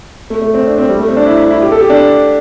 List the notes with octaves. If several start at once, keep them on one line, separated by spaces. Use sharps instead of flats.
A3
A3
C4
D4
C4
G3
A3
C4
D4
E4
E4
E4
G4
A4
G4
D4